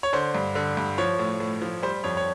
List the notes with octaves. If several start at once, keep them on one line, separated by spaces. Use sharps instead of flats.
C#5
D3 C5
G2
D3
G2
F3 C#5
A2
A2
F3
G3 C5
F2 C#5
C#5